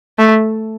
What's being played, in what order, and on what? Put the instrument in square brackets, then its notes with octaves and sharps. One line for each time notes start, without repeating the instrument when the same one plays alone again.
[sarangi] A3